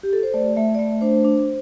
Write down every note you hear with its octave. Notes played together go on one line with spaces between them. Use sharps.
G4
A4
C5
A3 D5
A3 E5
D5
A3 E5
D4 C5
D4